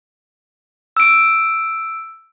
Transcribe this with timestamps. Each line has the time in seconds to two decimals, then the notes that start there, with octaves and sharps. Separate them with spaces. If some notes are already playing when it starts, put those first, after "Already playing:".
0.97 E6 D7